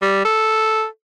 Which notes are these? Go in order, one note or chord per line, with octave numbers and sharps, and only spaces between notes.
G3
A4